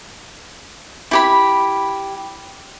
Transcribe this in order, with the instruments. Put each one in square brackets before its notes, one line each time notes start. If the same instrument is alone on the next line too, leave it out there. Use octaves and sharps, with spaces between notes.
[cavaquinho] E4 G4 B5